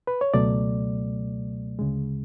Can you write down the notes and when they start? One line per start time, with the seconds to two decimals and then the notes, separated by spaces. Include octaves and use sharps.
0.07 B4
0.21 C#5
0.34 C#2 B2 F#3 A3 D5
1.79 D2 C#3 G#3